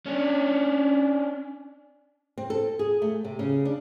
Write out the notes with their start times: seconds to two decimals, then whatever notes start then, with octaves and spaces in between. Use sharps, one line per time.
0.06 C#4 D4
2.38 C4
2.50 A4
2.79 G#4
3.02 A3
3.25 C3
3.39 C#3
3.65 D4